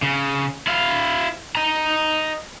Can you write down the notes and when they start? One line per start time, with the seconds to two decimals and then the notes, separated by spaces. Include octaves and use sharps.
0.02 C#3
0.67 E4 F5
1.55 D#5 A#5